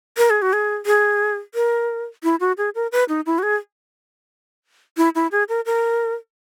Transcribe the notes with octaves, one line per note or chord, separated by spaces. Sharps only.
A#4
G#4
F#4
G#4
G#4
A#4
E4
F#4
G#4
A#4
B4
D#4
E4
F#4
G#4
E4
E4
G#4
A#4
A#4